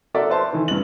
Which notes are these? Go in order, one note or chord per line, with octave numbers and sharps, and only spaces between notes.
F#4 A4 A#4 D5 E5
B4 C5 E5 A5 C6
D#3 E3
G2 F#7